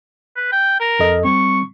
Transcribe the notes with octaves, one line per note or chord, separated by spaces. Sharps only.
B4
G5
A#4
F2 A4 D#5
G3 C4 C#6